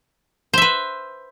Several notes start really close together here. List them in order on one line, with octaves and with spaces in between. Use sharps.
C5 E5 B4